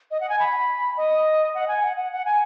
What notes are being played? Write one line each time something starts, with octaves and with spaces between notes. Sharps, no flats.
D#5
F#5
G#5
B5
D#5
F#5
G#5
F#5
F#5
F#5
G#5